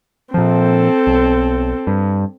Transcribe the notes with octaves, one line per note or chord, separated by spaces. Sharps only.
A#2 F3 C4 A4
B1
G2